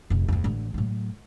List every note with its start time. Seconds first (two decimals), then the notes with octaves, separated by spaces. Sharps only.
0.10 F1 A#1
0.28 D1 F2
0.44 A1 D3
0.74 A2 F#3